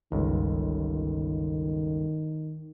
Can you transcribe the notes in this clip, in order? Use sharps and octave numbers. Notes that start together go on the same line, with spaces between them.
G1 C#2 D#3